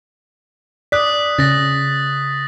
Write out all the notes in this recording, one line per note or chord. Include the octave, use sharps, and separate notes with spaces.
D5 D#6 F#6 B6
C#3 C#4 A6 A#6